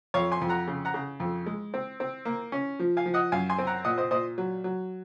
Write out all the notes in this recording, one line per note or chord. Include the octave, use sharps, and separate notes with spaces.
F2 C#5 F5
G#5 C6
F2
F#5 A#5
C#3
F#5 A#5
C#3
F2
G#3
C4
C4
A#3
C#4
F3
F5 G#5
F3
D#5 F#5
F#2 F5 G#5
G#5 C6
C4
F#5 A#5
A#2 D#5 F#5
C5 D#5
A#2 C5 D#5
F#3
F#3